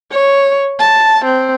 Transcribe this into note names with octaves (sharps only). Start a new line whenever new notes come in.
C#5
A5
C4